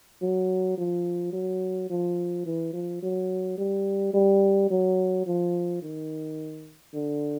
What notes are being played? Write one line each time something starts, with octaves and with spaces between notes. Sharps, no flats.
F#3
F3
F#3
F3
E3
F3
F#3
G3
G3
F#3
F3
D#3
D3